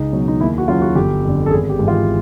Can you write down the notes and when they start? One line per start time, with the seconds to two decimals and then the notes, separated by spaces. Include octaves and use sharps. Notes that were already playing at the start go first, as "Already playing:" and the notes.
Already playing: C#2 D#4
0.12 B2 F#3
0.28 D#4
0.40 D#2 E4
0.58 F#4
0.68 C#3 F#3 F4
0.82 F#4
0.95 G1 G4
1.23 F2 D3
1.46 A4
1.51 G#1 G#4
1.69 G4
1.79 G#2 E3
1.88 F4